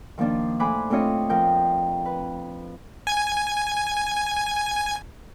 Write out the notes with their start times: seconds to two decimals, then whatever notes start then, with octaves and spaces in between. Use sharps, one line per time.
0.18 D#3 F3 A#3 D4 F4
0.60 A2 C5 G#5 B5 D6 F#6
0.90 A3 C4 D4 F4 C#5 D#5
1.30 F2 F3 A#4 G5 G6
2.05 B4
3.07 G#5 G#6